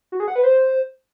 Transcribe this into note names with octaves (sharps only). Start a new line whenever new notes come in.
F#4
G#4
F#5
B4
C5